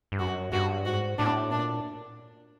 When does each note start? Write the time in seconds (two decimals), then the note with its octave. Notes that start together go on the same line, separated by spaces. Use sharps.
0.12 G2
0.19 F#2 F#4
0.52 G2 F#4
0.85 G#2 F#4
1.18 A2 D4
1.51 A#2 D4